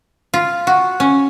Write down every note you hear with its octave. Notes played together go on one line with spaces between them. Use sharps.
F4
F#4
C#4